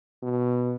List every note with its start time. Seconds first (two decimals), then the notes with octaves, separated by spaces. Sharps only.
0.23 B2